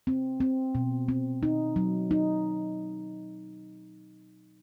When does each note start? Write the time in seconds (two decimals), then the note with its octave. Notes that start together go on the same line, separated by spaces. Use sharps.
0.07 C4
0.40 C4
0.75 B2
1.08 C4
1.43 D#4
1.76 F#3
2.11 D#4